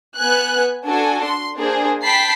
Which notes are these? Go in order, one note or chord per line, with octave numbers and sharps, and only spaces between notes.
B3 G#5 F#6
D4 F#4 A4 G#5
C6
A#3 D4 G#4 C5
G5 A5 B5 B6 C7